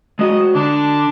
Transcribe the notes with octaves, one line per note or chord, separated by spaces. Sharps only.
G#3 F#4 D#5
D3 D4